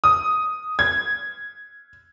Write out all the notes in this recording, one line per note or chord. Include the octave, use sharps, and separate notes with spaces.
D#6
G#6